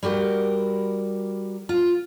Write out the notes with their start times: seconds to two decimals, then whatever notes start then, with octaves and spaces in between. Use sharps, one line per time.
0.03 G3 F#4 G4 A#4
1.69 F4